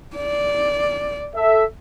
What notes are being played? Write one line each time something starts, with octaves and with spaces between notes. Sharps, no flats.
D5
A4 E5